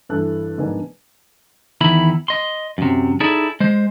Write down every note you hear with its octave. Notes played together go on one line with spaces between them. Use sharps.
G2 E3 A4 F#6
F1 G#2 B3 D4 A#4 G#5
E2 D#3 E4 B5
D#5 C6
F#2 C3
D#4 E4 G#4 A4 D5
G#3 C5